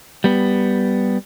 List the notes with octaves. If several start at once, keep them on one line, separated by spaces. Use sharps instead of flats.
G3 B3